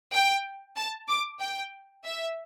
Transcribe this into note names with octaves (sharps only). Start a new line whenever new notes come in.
G5
A5
D6
G5
E5